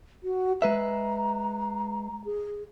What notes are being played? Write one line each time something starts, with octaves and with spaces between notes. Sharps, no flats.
F#4
G#3 B4 E5 A#5
G#4